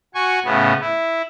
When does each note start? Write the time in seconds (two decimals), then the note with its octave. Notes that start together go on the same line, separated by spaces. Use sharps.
0.15 F#4 G#5 C#6
0.45 A2 C#3 B3
0.81 E4